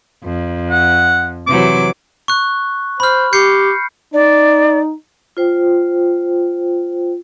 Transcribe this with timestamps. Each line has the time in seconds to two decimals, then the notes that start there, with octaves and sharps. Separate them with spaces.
0.24 F2
0.71 F#5
1.47 C3 E3 F#3 D6
2.28 C#6 F#6
3.00 C5 B5 F6
3.33 G4 G6 C7 C#7
4.14 D#4 D5
5.37 F4 C5 G5